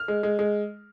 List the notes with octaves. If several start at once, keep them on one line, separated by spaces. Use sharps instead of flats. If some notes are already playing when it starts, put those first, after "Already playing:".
Already playing: F6
G#3
G#3
G#3